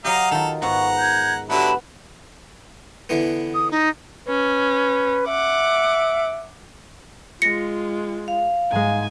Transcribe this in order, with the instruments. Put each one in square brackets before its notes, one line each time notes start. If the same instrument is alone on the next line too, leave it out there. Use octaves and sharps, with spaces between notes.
[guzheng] F#3 G4 [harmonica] D#5 F5 [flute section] A#5
[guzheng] D#3 F4 [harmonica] A4
[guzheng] G#2 B3 [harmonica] F#5 A#5 [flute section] C#6
[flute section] G6 G#6
[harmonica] D3 F#3 E4 [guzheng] B3 B4 [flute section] G4 A5 B5
[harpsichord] D3 E3 B3
[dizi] D#6
D#4
[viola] C#4 [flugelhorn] B4
[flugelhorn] E5 [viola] F#5 D6
[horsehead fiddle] G#3 F4 [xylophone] A#6 C#7
[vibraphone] F5
[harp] G#2 G#3 [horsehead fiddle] G#5